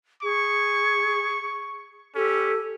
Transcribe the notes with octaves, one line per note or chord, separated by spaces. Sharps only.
G#4 C#6
C#4 G4 A4